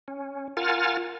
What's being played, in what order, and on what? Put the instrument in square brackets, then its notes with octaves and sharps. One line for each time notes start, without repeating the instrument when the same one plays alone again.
[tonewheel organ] C#4
F4 A#4 F#5 G#5 F6 A6